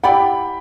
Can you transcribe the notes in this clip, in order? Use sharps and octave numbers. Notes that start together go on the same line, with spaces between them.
E4 G4 D5 F#5 G5 B5